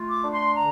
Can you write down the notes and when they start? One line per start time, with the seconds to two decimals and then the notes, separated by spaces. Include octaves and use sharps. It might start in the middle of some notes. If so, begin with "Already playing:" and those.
Already playing: A3 F4
0.09 D6
0.24 D4
0.32 C6
0.56 D3 A#5